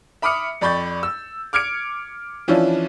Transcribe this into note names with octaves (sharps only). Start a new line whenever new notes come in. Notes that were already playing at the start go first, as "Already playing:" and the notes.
E5 B5 D6 D#6 F6 C#7
F2 D5 B5 C#6 G6 A6
E6
D6 F6 G#6 C#7 D7
E3 F3 C#4 D4 E4 F4